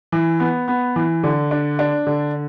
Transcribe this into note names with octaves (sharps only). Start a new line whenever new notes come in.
E3
B3
B3
E3
D3
D4
D4
D3